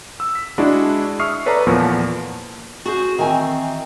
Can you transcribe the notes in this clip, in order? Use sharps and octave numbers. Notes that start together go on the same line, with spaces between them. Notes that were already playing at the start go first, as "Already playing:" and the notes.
E6
B6
G#3 D4 E4 F#4
E5 C#6 D#6 F6 C7
A4 B4 C#5 D5 A5 A#5
E2 A#2 F3 B3 A#4 C#6
F#4 G#4 C5
D#3 E3 C4 G#5